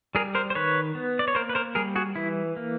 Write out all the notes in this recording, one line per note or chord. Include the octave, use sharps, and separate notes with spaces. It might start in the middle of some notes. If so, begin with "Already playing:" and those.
G3 G#4 A#4
A#4 C5
C5
D#3 B4 C#5
B3
D5
C#5
A#3 A#4 C5
B4
A#4 C5
G3 G#4 A#4
F#4 G#4
E3 E4
A#3